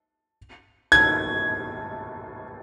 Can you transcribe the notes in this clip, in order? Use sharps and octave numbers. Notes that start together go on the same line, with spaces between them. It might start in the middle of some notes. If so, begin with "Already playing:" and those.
G#6